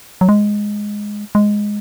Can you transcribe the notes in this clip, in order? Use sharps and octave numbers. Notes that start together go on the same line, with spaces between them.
F#3
G#3
G#3